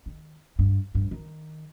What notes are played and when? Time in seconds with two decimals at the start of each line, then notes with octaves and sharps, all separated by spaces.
0.06 D#3
0.59 G2
0.95 G2
1.11 D#3